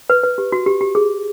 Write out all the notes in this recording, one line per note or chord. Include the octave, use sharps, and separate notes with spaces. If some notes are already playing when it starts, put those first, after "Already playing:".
B4
B4
G4
F#4
G4
G4
G#4